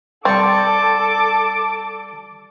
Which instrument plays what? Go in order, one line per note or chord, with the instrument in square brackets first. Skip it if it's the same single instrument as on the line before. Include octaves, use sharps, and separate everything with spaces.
[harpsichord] G3 D5 C#6 [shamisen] C4 [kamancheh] A4 A5 [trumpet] D6